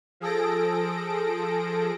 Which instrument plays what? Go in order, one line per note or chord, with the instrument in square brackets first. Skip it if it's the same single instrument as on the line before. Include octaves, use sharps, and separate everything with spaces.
[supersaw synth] F3 G#4 A4 A#6 D7